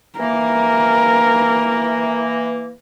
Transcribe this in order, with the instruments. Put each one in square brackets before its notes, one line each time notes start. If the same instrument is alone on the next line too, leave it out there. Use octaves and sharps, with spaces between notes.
[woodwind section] E3 A#3 [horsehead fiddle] A#4